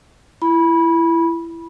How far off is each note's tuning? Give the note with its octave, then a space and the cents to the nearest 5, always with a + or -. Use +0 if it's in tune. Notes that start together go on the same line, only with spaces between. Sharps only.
E4 +20 B5 -20